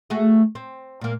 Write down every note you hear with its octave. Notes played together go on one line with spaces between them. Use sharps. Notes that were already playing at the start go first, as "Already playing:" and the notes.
A3 F#4 G#4
C4
A#2 A#3